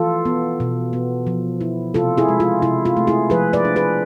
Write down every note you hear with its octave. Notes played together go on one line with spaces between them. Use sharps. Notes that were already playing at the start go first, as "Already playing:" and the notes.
Already playing: E3 F4 A4
B3
B2
B3
F3
E4
C3 F4 A4
E4 G#4
G#3
F4
C3 E4
F4
A3
E4 G#4
F3 G#4 B4
B4 D5
D4
G#4 B4